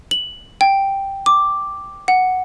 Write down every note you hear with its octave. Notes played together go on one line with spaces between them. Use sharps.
F#7
G5
D6
F#5